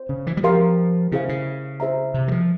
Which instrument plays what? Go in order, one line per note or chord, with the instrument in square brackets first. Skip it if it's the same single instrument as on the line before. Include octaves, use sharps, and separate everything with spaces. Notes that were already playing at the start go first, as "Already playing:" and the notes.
Already playing: [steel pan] C5
[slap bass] C#3
E3
G3
[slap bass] F3 [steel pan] G4 A#4 F5 C6
[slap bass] C#3 [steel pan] C#4 E4 G#4 C5 F5
[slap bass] C#3
[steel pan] E4 G#4 C5 E5 A#5
[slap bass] C3
E3
F3